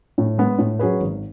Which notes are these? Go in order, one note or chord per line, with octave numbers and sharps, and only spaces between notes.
A2
G#3 B3
A2
F#3 C#4 G#4 B4
G#1